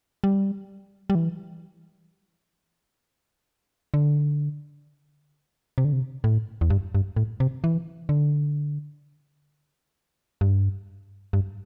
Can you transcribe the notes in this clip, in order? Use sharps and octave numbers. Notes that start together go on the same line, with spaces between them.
G3
G3
E3
D3
C3
D3
C3
A2
E2
G2
G2
A2
C3
E3
D3
G2
G2